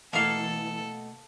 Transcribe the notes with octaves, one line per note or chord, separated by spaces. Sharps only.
B2 E3 A3 A#3 A4 F5 C#6